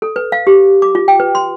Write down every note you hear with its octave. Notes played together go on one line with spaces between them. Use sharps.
A4
B4
F5
G4
D6
F4
G5
B4
C6